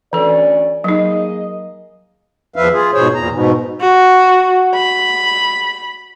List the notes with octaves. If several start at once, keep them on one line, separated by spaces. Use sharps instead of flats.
D2 E3 C#4 A4 D5
F#3 A#3 D#4 G#4 D#5
E2 F3 B4 E5 F5
F4 G#4
G#2 B2 G#4 C5 C#5
E2 A#2 A#5
G#2 B2
F#4
B5